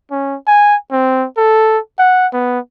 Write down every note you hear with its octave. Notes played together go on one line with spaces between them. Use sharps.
C#4
G#5
C4
A4
F#5
B3